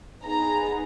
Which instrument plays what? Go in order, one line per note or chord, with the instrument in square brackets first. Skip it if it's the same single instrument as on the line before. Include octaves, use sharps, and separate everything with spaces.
[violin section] B3 D#4 G#4 A#5